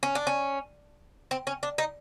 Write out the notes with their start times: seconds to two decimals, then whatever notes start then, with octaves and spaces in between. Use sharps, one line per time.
0.03 C#4
0.15 D4
0.27 C#4
1.31 C4
1.47 C#4
1.63 D4
1.78 D#4